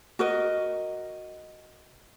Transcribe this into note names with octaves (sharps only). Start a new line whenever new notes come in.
F#4 A#4 D#5